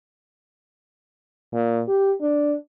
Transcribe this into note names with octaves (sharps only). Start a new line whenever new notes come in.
A#2
G4
D4